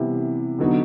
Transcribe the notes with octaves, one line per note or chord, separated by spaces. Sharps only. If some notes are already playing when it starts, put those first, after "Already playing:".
Already playing: C3 E3 G3 B3 E4
D3 F#3 B3 D#4 F#4